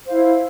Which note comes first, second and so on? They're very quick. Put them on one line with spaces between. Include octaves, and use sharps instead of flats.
C5 F5 E4